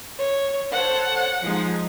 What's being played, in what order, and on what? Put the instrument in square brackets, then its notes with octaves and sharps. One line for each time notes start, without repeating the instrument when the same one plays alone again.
[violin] C#5
[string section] A4 C5 C#5 [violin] F#5
[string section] F3 G#3 D#4